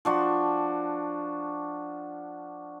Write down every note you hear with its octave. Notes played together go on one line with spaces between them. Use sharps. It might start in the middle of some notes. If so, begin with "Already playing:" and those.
F3 D4 F#4